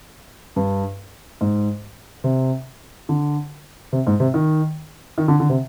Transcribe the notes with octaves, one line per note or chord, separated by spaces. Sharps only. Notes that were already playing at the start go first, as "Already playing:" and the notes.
G2
G#2
C3
D3
C3
G#2
C3
D#3
D#3
D3
D3
C3